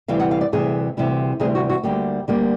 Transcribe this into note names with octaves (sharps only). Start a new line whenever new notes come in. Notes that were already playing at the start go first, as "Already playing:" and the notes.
D2 C3 E3 G3 F5
F#5
F5
D5
D2 C3 E3 G3 G#4
D2 C3 E3 G3
D2 C3 E3 G3 G#4
F#4
F#4
D2 D3 G3 A#3 G4
D2 D3 G3 A#3